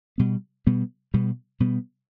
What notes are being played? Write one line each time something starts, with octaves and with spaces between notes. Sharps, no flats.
B2 G3 B3
B2 G3 B3
B2 G3 B3
B2 G3 B3